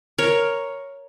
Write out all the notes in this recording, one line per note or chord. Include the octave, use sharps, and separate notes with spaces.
A#4 C#5